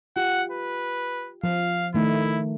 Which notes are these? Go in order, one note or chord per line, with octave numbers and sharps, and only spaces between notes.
F4 G4 F#5
B4
F3 F5
D#3 A3 D#4 E4